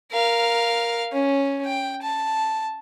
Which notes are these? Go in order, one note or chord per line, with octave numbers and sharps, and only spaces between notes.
A#4 F5
C#4
G5
A5